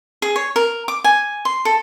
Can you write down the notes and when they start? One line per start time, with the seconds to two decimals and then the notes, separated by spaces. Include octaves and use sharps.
0.22 G#4
0.36 C#5
0.56 A#4
0.88 D6
1.04 G#5
1.45 C6
1.65 A4